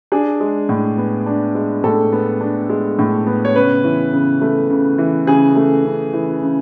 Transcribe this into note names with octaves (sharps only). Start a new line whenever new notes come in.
D4 G#4
G#3
A2
B3
D4
G#3
A2 A4
B3
D4
G#3
A2
B3
C#5
C#3 B4
E3
C#3
A3
C#3
E3
C#3 G#4
A3
C#3
E3
C#3